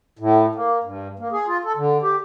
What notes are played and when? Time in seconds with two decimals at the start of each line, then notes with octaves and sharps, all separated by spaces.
0.19 A2
0.55 A#3
0.84 G2
1.19 A#3
1.32 G#4
1.47 F4
1.65 A4
1.76 D3
2.02 G4